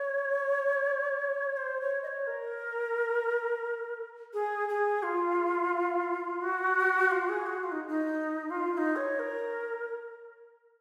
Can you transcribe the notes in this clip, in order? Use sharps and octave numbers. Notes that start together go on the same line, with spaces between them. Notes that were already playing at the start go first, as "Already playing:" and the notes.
Already playing: C#5
C5
C#5
D#5
C#5
A#4
G#4
G#4
F4
F#4
F4
G#4
F#4
F4
D#4
D#4
F4
F4
D#4
C#5
A#4